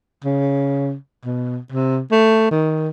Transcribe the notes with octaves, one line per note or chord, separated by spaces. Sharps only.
C#3
B2
C3
A3
D#3